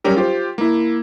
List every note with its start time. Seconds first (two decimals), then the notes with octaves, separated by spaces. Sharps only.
0.04 F#3 G3 C#4 G4 A#4
0.16 F4 G4 C5
0.58 A#3 E4